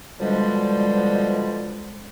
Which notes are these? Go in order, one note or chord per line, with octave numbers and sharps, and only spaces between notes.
B2 D3 F3 G3 G#3